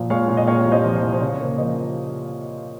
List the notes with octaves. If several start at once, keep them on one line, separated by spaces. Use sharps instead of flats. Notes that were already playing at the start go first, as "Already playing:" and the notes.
Already playing: A#2 F3
G#3 C#5 F5
A#2
D#5
A#2 C#5 F5
C2
C5 D#5
F3
C5
C2
C5
C#3 C#5
A#3
F3 C5 D#5